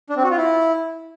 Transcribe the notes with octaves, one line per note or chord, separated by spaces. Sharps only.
D4
C4
F#4
F4
E4